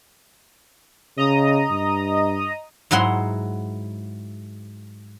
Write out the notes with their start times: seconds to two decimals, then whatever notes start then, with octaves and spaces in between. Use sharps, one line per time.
1.18 C#3 D#5 A#5 D#6
1.71 G2
2.91 G#2 F#3 E4 F#5 C6